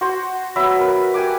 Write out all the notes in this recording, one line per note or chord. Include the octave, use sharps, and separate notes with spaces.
F#4 C5
F#3 B3 E5 B5
A#4 B4
G4 F#5 G#5 D6